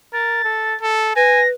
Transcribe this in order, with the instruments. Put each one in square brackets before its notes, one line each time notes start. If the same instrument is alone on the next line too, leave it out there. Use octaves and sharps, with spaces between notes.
[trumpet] A#4 [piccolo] A6
[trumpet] A4
A4
[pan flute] B4 [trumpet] G#5 [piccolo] A#6